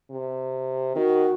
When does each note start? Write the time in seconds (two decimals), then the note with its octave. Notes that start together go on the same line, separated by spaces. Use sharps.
0.10 C3
0.96 D#3 F#4